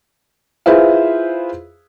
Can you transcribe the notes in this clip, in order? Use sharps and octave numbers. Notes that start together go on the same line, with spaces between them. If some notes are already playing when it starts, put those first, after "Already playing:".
E4 F4 G#4 B4 C5 F5